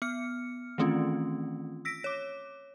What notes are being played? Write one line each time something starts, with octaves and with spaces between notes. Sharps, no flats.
B3 F6 C#7
D#3 E3 A3 C4 C#4 F4
E6 A#6 B6 D7
C#5 D6